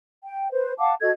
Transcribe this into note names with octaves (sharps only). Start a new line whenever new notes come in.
G5
B4 C5
F5 F#5 A5 D6
F#4 A4 D#5 G#6